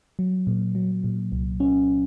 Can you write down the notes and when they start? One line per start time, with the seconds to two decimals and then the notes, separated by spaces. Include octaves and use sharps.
0.19 F#3
0.47 A#2
0.75 F#3
1.04 A#2
1.32 C2
1.60 C#4